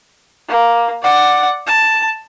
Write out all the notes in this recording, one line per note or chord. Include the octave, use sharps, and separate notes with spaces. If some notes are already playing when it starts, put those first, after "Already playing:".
A#3
D5 F#5
A5